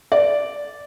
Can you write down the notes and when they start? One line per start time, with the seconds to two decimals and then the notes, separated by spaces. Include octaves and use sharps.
0.12 D5